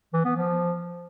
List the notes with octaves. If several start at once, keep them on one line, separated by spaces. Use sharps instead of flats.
E3
B3
F3